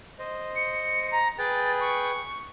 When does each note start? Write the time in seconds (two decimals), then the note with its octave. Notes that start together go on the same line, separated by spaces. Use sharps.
0.19 C5 D#5
0.56 C#7
1.12 A#5
1.38 G#4 B4 G5 A6
1.81 C#6